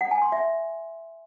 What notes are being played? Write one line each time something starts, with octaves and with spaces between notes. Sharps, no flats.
F#5
G#5
C6
E5